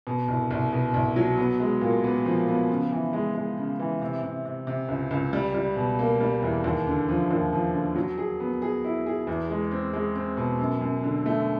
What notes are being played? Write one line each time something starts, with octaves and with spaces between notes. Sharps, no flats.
B2
C2
C2
B2
C2
F#3
B3
G#3
A#2
B3
F3
B3
C#3
E3
G#3
G#3
C#3
E3
C3
C3
C3
C3
C#2
C#2
G3
G3
B2
A#3
G3
E2
D#2
D3
F3
D#2
F3
D3
F#3
G#4
B3
G#4
E4
G#4
E2
G#3
C4
G#3
C4
B2
F#2
F#2
D3
A3